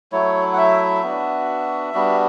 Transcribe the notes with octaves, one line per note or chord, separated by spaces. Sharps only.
F#3 A3 E4 C#5
F#5
E5
B3 D4 F#4
G3 B3 D4 F#4